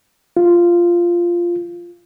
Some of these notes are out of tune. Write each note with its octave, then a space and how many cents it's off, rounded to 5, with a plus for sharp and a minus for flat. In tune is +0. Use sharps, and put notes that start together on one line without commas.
F4 -10